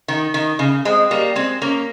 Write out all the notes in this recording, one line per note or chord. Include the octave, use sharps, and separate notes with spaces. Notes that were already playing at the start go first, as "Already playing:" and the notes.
D#3
D#3
C#3
G#3 C4
G3 A#3
G#3 C4
A#3 C#4